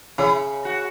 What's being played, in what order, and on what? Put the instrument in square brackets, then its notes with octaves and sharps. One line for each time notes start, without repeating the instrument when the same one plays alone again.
[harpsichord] C#3 [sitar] E4
[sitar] F#4